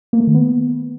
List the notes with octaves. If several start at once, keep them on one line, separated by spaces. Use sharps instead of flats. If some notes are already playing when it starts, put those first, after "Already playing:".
A#3
A3
D#3
B3